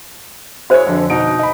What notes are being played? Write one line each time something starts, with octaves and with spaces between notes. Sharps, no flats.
E4 F#4 G#4 C5 C#5
F2 D3
B2 D#4 D7
D#5 B5